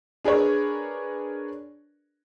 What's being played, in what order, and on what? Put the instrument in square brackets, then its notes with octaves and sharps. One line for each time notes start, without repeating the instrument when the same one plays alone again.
[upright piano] D4 G#4 A#4 B4 C#5 D5